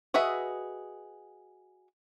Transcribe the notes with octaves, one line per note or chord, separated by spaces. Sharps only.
F#4 G#4 B4 D#5 E5